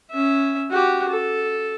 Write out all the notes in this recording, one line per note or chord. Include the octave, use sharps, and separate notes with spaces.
C#4 E5
F#4 G4
A4